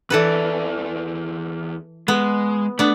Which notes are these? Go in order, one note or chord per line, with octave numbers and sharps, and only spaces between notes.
E2 E3 A4 B4 D5
G#3 B3
A3 B3 D4